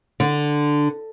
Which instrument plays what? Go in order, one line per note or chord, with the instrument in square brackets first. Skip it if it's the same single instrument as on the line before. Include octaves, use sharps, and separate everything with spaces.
[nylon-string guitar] D3